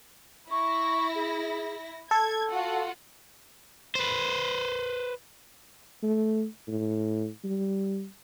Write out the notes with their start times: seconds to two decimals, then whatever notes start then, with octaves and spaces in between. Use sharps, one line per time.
0.51 E4 C#6 A#6
1.15 G#4
2.11 A4 A5 G#6
2.51 F4 F#4 F#5
3.95 B4 C5
6.03 A3
6.68 A2
7.44 G3